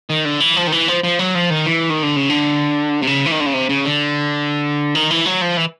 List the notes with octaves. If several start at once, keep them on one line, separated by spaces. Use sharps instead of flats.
D#3
D3
E3
F3
D#3
E3
F3
F3
F#3
F3
D#3
E3
D#3
D3
C#3
D3
C3
C#3
E3
D#3
D3
C#3
C3
C#3
D3
D#3
E3
F#3
F3
E3